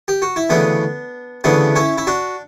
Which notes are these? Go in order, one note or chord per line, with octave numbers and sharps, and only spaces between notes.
G4
F#4
E4
D2 C#3 E3 B3 D4
D2 C#3 E3 B3 D4
C#4 E4
E4
D4 F#4